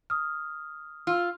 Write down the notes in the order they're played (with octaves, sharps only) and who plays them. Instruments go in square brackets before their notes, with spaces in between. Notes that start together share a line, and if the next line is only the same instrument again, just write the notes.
[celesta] D#6 F6
[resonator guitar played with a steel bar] F4 [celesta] E6 F6